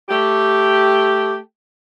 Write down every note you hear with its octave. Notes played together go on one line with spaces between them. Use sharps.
A3 G4